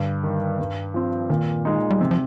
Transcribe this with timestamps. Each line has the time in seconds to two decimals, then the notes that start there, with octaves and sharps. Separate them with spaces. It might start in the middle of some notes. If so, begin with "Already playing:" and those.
Already playing: G2 D3
0.23 D#3 G3
0.59 G2
0.94 F3 C4
1.30 A#2 D#3
1.65 G#3 D#4
1.90 G3
2.00 C3 F3
2.11 F3